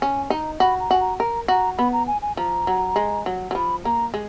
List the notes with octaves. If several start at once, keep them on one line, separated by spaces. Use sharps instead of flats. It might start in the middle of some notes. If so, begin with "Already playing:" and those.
C#4 G#5
D#4 A#5
F#4 B5
A#5
F#4 G#5
A#5
A#4 A#5
F#4 A#5
B3 B5
A#5
G#5
G#5
F3 A#5
F#3
G#3
F#3
F#3
F3 B5
A#3 A#5
G#3